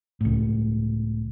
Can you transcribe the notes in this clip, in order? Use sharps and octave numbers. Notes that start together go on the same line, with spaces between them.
C#2 A2